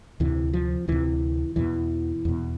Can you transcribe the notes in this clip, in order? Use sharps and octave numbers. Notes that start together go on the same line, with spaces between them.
D2 C3 E3
F3
D2 C3 E3
E2 B2 E3
E2 B2